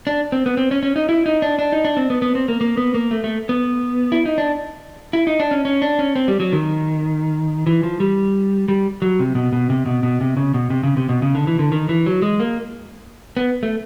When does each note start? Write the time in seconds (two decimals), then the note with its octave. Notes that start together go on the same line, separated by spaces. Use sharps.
0.07 D4
0.32 C4
0.46 B3
0.57 C4
0.71 C#4
0.83 C#4
0.96 D#4
1.09 E4
1.26 D#4
1.42 D4
1.59 D4
1.72 D#4
1.85 D4
1.97 C4
2.10 B3
2.22 B3
2.35 C4
2.48 A#3
2.61 A#3
2.77 B3
2.94 A#3
3.11 A3
3.24 A3
3.49 B3
4.12 E4
4.26 D#4
4.38 D4
5.13 E4
5.27 D#4
5.40 D4
5.51 C#4
5.65 C#4
5.82 D4
5.99 C#4
6.15 C4
6.28 G3
6.40 F#3
6.52 D#3
7.67 E3
7.83 F3
8.00 G3
8.68 G3
9.02 F#3
9.19 C3
9.35 B2
9.53 B2
9.70 C3
9.86 B2
10.03 B2
10.21 C3
10.37 C#3
10.54 B2
10.70 C3
10.83 C#3
10.97 C3
11.09 B2
11.22 C#3
11.35 D3
11.47 E3
11.59 D3
11.72 D#3
11.89 E3
12.06 F#3
12.22 G#3
12.40 A#3
13.37 B3
13.63 A3